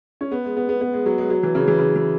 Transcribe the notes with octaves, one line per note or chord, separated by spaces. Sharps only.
C#4
B3
G#3
B3
B3
B3
G#3
F#3
G#3
F#3
E3
C#3
E3
C#3
E3